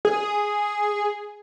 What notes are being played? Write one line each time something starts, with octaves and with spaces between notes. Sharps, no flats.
G#4